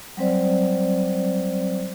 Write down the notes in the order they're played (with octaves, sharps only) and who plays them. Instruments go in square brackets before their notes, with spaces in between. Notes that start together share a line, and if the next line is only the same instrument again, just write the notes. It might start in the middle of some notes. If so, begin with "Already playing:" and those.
[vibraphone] F#3 G3 C4 C5 D5